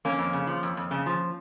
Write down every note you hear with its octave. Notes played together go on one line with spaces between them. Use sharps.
F2 A#3 C#4
F2
C#3
F3
F2
F2
C#3
F3